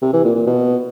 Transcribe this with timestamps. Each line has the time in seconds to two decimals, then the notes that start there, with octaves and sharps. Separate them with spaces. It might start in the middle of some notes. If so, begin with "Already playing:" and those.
0.02 C3
0.13 E3
0.24 A#2
0.35 A#2
0.47 B2